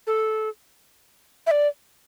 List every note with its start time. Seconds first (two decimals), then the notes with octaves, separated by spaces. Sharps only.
0.07 A4
1.46 E5
1.51 D5